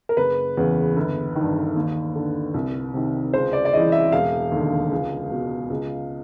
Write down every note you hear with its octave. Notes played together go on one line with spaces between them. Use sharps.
A#4
F#1 B4
E2 C#3
G1
D#3
G2
D#2
D3
C2
C3 D#3
C#2 C5
D5
D5
C#3 E3 D#5
E5
E1 F5
D#2 D3
C#2
B2
C#2